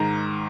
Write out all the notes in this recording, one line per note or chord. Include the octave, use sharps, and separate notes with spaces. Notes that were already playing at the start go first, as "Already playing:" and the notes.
Already playing: G#2 D#3 A#5